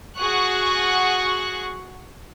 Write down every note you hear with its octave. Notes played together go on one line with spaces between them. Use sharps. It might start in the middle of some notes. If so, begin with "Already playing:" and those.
F#4 G#4 F#5 C#6 F#6